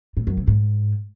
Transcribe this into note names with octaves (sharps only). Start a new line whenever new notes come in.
A2
F#2
C3
G#2